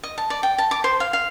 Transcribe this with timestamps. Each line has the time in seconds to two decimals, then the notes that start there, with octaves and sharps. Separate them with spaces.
0.04 D#5
0.18 A5
0.30 D5
0.43 G5
0.58 A5
0.71 D6
0.84 C5
1.00 F5
1.13 F5